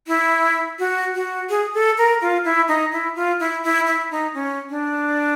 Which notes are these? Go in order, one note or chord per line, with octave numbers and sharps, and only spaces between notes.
E4
F#4
F#4
G#4
A4
A#4
F4
E4
D#4
E4
F4
E4
E4
E4
D#4
C#4
D4